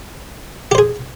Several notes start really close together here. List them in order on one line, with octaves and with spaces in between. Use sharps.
G4 C5 G#4